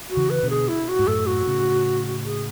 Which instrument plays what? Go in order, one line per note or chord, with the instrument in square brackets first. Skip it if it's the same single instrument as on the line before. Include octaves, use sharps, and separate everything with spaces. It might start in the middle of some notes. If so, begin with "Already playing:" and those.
[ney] F#4
[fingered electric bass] C#3 E3
[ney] B4
[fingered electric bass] B2 D3
[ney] G#4
E4
F#4
[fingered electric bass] G#2
[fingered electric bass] F#2 A2 [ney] A4
[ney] F#4
[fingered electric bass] A2 C#3
[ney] G#4